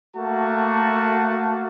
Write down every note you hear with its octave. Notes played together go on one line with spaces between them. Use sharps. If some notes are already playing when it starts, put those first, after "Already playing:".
A3 A#3 F#4 A5